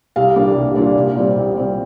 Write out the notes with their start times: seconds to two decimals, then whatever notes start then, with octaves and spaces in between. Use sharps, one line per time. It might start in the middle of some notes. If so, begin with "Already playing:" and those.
0.16 C2 F5
0.36 A#2 G3 A#3 D4
0.56 C2
0.75 A#2 G3 A#3 D4
0.96 C2
1.16 A#2 G3 C4
1.36 C2
1.55 A#2 G3 C4